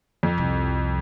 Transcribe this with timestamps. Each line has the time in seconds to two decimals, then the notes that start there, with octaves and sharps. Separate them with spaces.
0.23 F2
0.38 C2